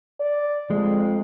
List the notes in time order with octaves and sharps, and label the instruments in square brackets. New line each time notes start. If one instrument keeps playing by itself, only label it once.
[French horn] D5
[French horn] F2 [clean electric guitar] G#3